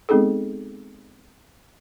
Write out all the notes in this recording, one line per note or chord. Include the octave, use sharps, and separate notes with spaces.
G#3 B3 C4 D#4 G#4 A4